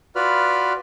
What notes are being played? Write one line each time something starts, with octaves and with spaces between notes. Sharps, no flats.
F4 F#4 B4 D5 B5 F6